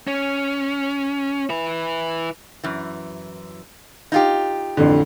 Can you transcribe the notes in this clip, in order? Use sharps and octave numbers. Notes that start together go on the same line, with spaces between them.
C#4
E4 B4
F#2 E3
D#4 F4 G4
A1 F2 D3